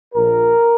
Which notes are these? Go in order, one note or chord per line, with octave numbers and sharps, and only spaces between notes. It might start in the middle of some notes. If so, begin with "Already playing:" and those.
A#1 A#2 F3 A#4